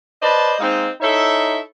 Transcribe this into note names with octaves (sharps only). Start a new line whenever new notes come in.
B4 C5 D5 D#5 A5
G#3 A#3 C4 D#4
D#4 E4 A4 C#5 E5